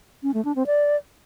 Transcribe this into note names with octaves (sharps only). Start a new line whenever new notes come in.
C#4
A3
D4
C4
D5